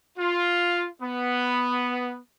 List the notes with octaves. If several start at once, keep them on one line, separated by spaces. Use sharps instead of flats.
F4
B3